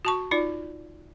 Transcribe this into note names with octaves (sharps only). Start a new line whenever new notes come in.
F#4 A5 C#6
D#4 F4 D5